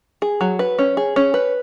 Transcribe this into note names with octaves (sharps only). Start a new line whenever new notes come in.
G#4
F#3
B4
C#4
G#4
C#4
B4